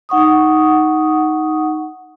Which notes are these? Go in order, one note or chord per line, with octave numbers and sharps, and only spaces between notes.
D#4 F#5 C#6 D#6